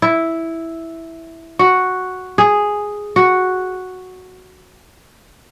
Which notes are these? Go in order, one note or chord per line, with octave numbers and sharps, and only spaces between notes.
E4
F#4
G#4
F#4